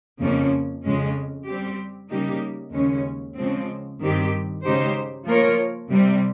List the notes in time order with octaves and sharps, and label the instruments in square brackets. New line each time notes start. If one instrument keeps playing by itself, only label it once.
[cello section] F2 C#3 F3 A#3 C#4
F2 C#3 G#3 C#4
G3 C4 G4
C#3 G3 A#3 D#4 G4
D#2 C#3 G#3 C#4
C#3 F3 G#3 C4
G2 D#3 G3 C4 G4
C#3 G#3 D#4 G4 C5
F3 A#3 F4 A#4 C#5
C3 G3 C4